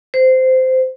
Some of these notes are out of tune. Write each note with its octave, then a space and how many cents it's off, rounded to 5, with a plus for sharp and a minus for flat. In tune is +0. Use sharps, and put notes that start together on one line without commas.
C5 -15